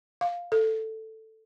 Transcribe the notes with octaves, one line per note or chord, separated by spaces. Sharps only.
F5
A4